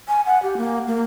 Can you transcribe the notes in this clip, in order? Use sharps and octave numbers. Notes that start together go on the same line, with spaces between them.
G#5
F#5
G4
A#3
A#3